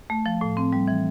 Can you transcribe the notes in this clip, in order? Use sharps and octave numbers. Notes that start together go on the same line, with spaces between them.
A3
F3
A2
C4
G3
E3